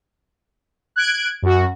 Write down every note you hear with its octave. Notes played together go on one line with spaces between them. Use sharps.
F#6 G#6 D7
F#2 F#4